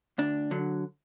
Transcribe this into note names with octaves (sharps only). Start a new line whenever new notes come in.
D2 D4
D3 F#3